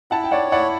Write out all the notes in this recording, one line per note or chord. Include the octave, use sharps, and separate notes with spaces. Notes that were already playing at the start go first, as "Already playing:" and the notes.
E4 F#5 A5
G5
C#5 D5 F#5
E4 D5 F#5